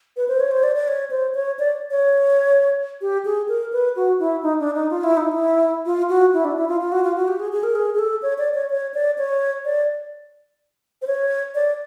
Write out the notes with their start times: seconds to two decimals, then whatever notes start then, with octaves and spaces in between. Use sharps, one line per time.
0.17 B4
0.28 C5
0.40 C#5
0.51 C5
0.63 D5
0.75 D5
0.88 C#5
1.10 C5
1.34 C#5
1.59 D5
1.91 C#5
3.01 G4
3.25 G#4
3.48 A#4
3.72 B4
3.96 F#4
4.19 E4
4.43 D#4
4.60 D4
4.75 D#4
4.90 F4
5.03 E4
5.17 D#4
5.32 E4
5.86 F4
6.09 F#4
6.33 E4
6.44 D4
6.57 E4
6.69 F4
6.81 F4
6.92 F#4
7.04 F4
7.16 F#4
7.28 G4
7.40 G#4
7.52 G#4
7.63 A#4
7.75 G#4
7.94 G#4
7.99 A4
8.22 C#5
8.38 D5
8.54 C#5
8.70 C#5
8.94 D5
9.18 C#5
9.65 D5
11.02 C5
11.07 C#5
11.55 D5